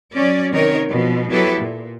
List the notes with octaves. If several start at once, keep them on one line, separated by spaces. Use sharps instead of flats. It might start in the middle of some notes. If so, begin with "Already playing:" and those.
F#3 C#4 D5
C3 D#3 B3 D#4 A#4 C#5
B2 F3
F#3 B3 E4 G4 A4 B4
A#2